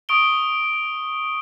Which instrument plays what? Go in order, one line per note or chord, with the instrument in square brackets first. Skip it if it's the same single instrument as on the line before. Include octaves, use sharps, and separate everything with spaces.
[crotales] C#6 D#6 D7 G7